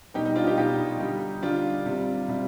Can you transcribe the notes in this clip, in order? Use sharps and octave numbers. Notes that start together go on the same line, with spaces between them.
B2 G3 D#4 G4
D#4
D4 F4
D#4 G4
B2 G3 D#4 G4
D3 G3
D3 G3 D4 F4
C3 G3
C3 G3